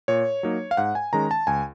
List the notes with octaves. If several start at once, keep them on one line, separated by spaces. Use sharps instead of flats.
A#2 C#5
F#3 A#3 D#4
F5
G#2 F#5
G#5
D#3 G#3 C#4 A#5
A5
C#2 G#5